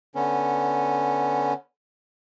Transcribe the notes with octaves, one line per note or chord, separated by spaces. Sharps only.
D3 B3 C#4